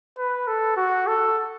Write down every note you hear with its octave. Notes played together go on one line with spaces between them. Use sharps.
B4
A4
F#4
A4